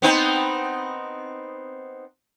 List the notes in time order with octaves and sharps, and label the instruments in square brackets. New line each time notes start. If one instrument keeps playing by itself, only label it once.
[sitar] B3 C4 D#4